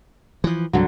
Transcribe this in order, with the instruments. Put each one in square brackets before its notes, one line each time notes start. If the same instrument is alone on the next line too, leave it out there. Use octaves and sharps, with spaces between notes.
[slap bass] E3 F3
[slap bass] C2 G2 [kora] D3 F#3